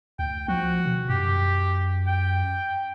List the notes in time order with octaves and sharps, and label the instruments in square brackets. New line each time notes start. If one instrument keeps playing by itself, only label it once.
[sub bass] D2 [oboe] G5
[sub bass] F3 [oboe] F#4
[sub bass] B2
[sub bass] F#2 [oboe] G4
[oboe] G5